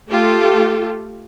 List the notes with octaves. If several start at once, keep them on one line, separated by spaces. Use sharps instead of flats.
A3 F4 G4 A4